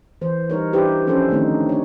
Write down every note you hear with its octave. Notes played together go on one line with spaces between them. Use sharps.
E3 C5
G3 D#4 A#4 C#5
D4 E4 G4 B4 C5
F3 C#4 D4 A4 C5
D3 D#3 A3 C4 D#4
D4 C#5